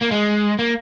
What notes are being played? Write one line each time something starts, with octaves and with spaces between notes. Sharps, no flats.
A#3
G#3
A#3